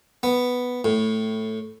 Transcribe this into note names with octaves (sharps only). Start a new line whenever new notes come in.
B3
A2